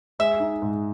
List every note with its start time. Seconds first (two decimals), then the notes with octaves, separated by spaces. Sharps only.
0.19 G#3 E5
0.40 D#4
0.62 G#2